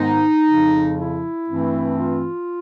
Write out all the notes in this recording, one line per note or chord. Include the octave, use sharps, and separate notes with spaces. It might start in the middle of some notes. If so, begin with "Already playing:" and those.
Already playing: G#2 D#3 G#3 B3 D#4
F2 C#3 F3
E4
G2 E3 A3 C4
F4